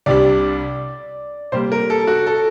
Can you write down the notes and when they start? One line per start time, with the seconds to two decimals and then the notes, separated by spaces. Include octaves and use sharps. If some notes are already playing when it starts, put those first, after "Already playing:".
0.06 C2 C3 G3 D4 D5
1.52 C3 G3 A#3 C5
1.72 A#4
1.90 A4
2.07 F#4
2.27 A4